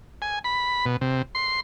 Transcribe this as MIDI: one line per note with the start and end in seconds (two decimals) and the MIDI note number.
0.22 0.39 80
0.44 0.85 83
0.86 0.97 47
1.01 1.22 48
1.35 1.60 84